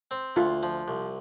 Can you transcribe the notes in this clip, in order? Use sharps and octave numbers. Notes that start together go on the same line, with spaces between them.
C4
D2 F4
F3
C2